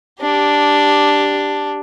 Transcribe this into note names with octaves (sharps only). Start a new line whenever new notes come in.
D4 G4